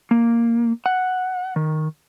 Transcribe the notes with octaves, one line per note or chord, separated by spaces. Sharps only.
A#3
F#5
D#3